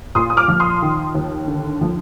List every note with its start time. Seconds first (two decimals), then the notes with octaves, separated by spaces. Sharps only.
0.15 A#2 C6 D#6
0.30 D#6
0.37 D6 F6
0.48 F3
0.60 C6 D#6
0.82 D#3
1.15 D#2
1.48 D3
1.81 F3